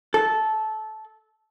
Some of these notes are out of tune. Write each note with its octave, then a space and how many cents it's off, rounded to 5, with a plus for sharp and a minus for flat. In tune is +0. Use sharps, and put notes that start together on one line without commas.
A4 -15